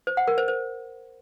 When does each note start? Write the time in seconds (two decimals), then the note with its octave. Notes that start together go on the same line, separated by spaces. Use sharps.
0.07 C5
0.17 F#5
0.28 A#4
0.38 C5
0.48 C5